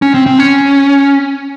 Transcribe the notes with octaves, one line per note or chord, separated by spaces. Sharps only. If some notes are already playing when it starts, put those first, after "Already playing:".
C#4
C4
C4
C#4